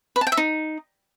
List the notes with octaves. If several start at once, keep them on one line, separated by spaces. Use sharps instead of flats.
B4
A5
G5
E5
D#4